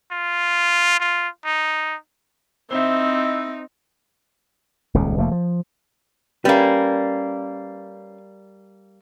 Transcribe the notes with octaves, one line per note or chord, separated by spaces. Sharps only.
F4
F4
D#4
C4 D#4 E4 C5 E5
D#1 C#2 C#3
F1 F3 A3 A#3
F3
G3 A#3 C#4 B4